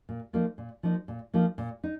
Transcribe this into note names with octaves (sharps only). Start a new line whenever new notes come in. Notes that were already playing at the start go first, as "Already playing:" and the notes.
A#2
F3 A#3 D#4
A#2
F3 A#3 D#4
A#2
F3 A#3 D#4
A#2
D#4